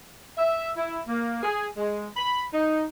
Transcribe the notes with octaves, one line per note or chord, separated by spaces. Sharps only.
E5
E4
A#3
G#4
G#3
B5
D#4